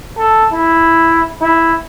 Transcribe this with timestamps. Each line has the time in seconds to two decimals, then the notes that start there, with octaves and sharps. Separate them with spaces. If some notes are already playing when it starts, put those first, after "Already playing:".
0.18 A4
0.53 E4
1.41 E4